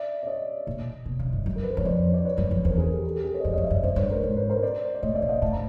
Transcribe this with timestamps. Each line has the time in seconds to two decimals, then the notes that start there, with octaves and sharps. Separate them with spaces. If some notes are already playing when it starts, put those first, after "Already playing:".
Already playing: D5 E5
0.23 D5
0.27 C#5 D#5
0.67 A#2
1.06 B2
1.19 C#3
1.33 G2
1.46 F#2
1.55 A#4
1.63 B4
1.70 C5
1.77 E2 C#5
1.85 F2 C5 D5
2.14 D5
2.25 B4 C#5
2.38 F#2
2.51 F2
2.65 E2 A#4 C5
2.78 G#4 A#4
2.91 G4 A4
3.04 G#4 A#4
3.14 G4 A4
3.24 G#4 A#4
3.34 B4 C#5
3.40 D#5
3.44 F2 C5 D5
3.54 C#5 D#5
3.58 F2
3.64 D5 E5
3.70 F#2
3.74 C#5 D#5
3.83 F#2 C5 D5
3.96 G2 B4 C#5
4.10 G#2 A#4 C5
4.24 G#2
4.36 B4 C#5
4.50 A#4 C5
4.63 C5 D5
4.95 D5
5.02 A2 C#5 D#5
5.15 D5 E5
5.22 A#2
5.29 D#5 F5
5.42 A2 A5
5.53 A#5